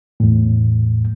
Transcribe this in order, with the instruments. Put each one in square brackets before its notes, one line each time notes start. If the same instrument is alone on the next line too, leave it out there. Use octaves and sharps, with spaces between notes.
[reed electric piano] E2 A2